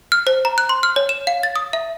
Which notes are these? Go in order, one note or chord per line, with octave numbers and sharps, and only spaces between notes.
F6
C5
A#5
F#6
C6
F6
C#5
E7
F5
A6
D#6
E5